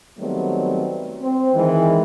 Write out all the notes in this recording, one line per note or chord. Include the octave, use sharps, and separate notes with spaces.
D#3 F#3 G3 A3 B3 C4
C4
D#3 E3 G#3